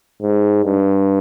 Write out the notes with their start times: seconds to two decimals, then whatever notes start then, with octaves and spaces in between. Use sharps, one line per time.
0.22 G#2
0.65 G2